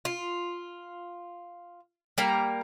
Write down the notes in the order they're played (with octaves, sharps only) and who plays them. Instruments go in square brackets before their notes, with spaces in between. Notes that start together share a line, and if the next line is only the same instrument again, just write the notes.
[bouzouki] F4
G3 A#3 A#5